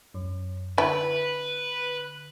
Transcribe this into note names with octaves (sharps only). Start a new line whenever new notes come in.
F#2
D3 E4 B4